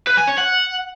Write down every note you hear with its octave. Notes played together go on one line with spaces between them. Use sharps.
B4
G#5
C#5
F#5